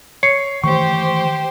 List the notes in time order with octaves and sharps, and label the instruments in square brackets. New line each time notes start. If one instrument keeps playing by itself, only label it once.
[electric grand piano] C#5 [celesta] C7 C#7
[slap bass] D#3 E3 A3 [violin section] G4 C5 [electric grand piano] C#6